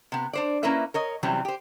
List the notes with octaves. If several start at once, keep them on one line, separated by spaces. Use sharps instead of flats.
C3 B3
D4 C5 D5
A#3 C#4 E4 A#4 B4 E5
A#4 C#5 D#5
C3 E3 F#3 G3 C4 C#4
G4 C5